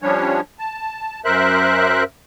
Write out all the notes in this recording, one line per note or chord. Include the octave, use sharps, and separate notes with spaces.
F3 G3 C#4 D4 C#5
A5
F#2 A#4 C5 E5 F#6